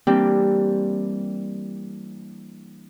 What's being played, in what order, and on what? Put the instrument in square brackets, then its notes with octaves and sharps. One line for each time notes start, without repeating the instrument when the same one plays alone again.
[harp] E3 G3 A#3 C4 D4 G4